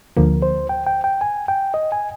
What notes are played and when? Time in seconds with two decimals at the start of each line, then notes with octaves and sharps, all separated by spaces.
0.17 D2 D3 F3 A#3 A#4
0.42 C5
0.69 G5
0.87 G5
1.04 G5
1.21 G#5
1.48 G5
1.74 D#5
1.92 G#5